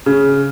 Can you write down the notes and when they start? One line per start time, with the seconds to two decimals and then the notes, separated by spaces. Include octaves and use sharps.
0.06 C#3